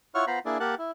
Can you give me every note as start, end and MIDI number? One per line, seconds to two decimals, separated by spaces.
0.15 0.25 64
0.15 0.25 65
0.15 0.25 73
0.15 0.25 78
0.15 0.25 85
0.15 0.25 89
0.27 0.39 59
0.27 0.39 65
0.27 0.39 72
0.27 0.39 77
0.27 0.39 82
0.27 0.39 83
0.45 0.58 58
0.45 0.58 62
0.45 0.58 64
0.45 0.58 68
0.45 0.58 74
0.60 0.75 58
0.60 0.75 67
0.60 0.75 70
0.60 0.75 78
0.60 0.75 81
0.60 0.75 90
0.78 0.91 64